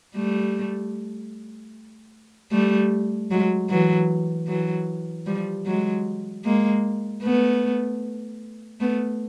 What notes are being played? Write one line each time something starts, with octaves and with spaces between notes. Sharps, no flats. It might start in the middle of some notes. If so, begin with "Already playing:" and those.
G3 A3
G3 A3
F#3 G#3
E3 F#3
E3 F#3
F3 G3
F#3 G#3
G#3 A#3
A3 B3
A3 B3